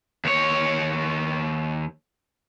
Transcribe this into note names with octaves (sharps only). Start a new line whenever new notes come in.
D#2 C#5